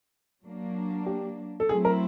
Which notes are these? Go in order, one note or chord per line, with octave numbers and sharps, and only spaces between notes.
F#3 A#3 D4
G4
A4
F#3 A3 C4 E4 G#4
A#4